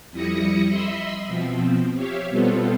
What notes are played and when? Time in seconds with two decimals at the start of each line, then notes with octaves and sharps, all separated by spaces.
0.11 F2 G3 E4 D#6 A#6 C#7
0.69 D#5 E5 B5 C6 E6
1.26 B2 F3 C4
1.94 G4 C#5 E5 F5
2.29 B2 G3 B3 C4 F4 A4